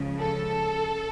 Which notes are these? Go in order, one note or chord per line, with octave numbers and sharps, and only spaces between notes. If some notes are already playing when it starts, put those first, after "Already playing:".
Already playing: C#2 C#3 F3
A4